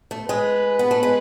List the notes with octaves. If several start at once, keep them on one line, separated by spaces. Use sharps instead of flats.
A3
G#3 B4
B3
A3
G#3